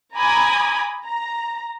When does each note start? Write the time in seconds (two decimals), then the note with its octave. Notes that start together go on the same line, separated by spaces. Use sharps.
0.17 G#5 A#5 B5 D6 D#6 G#6
1.06 A#5